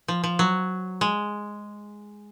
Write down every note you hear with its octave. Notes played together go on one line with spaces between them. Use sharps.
F3
F3
F#3
G#3